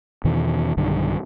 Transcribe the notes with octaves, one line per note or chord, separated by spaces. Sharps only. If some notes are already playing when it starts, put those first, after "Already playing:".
E2 B2 D#3 E3
B1 G2 D3 D#3